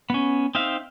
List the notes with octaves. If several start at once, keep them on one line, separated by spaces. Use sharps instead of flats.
B3 C#4
C4 D#4 E5 F5